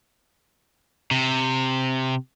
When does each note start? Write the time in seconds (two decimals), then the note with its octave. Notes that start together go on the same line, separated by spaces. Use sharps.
1.11 C3